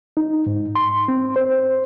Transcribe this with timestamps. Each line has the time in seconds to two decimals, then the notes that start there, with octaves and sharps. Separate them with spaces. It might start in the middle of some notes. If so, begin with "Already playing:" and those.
0.17 D#4
0.46 G#2
0.75 C6
1.08 C4
1.36 C5